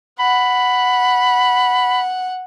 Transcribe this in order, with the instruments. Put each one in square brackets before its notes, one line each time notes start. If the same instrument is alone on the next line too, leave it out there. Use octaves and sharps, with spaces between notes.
[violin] F#5 [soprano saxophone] B5